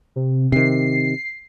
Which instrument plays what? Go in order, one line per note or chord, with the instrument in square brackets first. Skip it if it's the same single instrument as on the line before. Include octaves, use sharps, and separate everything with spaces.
[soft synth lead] C3
[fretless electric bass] C3 D#3 [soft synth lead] C7